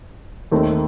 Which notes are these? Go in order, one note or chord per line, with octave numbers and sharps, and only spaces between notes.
D#2 D#3 A3 C4